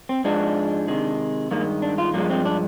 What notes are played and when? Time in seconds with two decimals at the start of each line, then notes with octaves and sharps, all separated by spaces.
0.09 C4
0.24 G#2 F3 G#3 D4
0.88 C3 D#3 G#3
1.51 G2 D#3 G#3 A#3
1.82 D4
1.98 F4
2.14 G2 F3 G#3 A#3
2.30 C4
2.45 D4